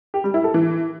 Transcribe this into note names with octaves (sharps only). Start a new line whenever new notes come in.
G4
G3
E4
A4
E3